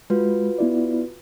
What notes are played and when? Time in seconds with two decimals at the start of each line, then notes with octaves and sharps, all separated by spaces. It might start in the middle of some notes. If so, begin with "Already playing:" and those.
0.10 G#3 F4 F#4 B4
0.58 B3 E4 D5